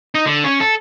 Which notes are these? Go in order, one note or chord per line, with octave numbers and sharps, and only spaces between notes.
D#4
D3
C#4
A4